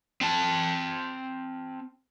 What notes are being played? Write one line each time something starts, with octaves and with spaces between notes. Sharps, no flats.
C4 A5